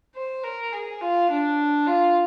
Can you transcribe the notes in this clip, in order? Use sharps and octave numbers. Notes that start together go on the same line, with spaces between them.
C5
A#4
G#4
F4
D4
F4